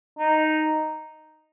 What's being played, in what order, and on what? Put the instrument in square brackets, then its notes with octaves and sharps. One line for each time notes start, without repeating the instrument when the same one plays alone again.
[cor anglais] D#4